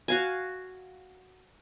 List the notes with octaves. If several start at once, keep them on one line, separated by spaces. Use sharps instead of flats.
F#4 F5 G#5